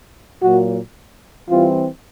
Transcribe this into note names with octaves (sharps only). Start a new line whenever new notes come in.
A#2 F#3 A#3 F#4
E3 G3 C4 F4